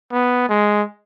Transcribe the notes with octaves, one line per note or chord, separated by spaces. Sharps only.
B3
G#3